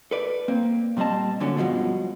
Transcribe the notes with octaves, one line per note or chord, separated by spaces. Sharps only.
A4 B4 D5
A#3 C4
A#2 G3 C4 D#5 A5
A#2 D3 F#3 C#4
G2 B2 D3 F3 G#3